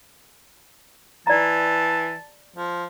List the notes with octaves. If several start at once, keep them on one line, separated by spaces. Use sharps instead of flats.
E3 D5 A5 A#5
F3